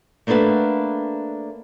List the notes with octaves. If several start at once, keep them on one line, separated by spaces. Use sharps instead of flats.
A3 A#3 D4 A4 B4 F#5